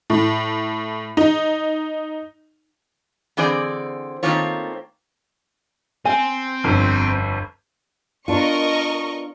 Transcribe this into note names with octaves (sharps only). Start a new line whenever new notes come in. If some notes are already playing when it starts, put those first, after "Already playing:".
A2
D#4
D3 E3 C4 G#4 C5 D5
D#3 A3 A#3 C4 F4 C#5
C4 G#5
G1 F2
B3 D4 F4 A#4 D#5 C#6